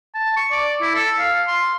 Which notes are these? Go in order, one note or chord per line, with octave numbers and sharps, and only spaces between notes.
A5
C#6
D5
E4
A4
F5
C6